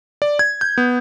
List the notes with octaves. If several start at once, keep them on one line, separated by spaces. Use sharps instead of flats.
D5
G#6
G6
B3